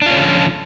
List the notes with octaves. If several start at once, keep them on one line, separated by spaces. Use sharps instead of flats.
D3 F3 C#4 D4 F4